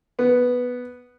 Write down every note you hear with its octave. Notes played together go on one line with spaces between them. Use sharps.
B3